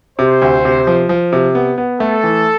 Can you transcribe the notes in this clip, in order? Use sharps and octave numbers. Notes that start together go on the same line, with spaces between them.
C3 C5
D2
C3
F3
F3
C3
B3
B3
A3 A4
E3